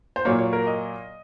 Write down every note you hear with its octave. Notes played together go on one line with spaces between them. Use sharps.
C5
A#2 F#3 A#3 C#5
C#5
A#4
D#5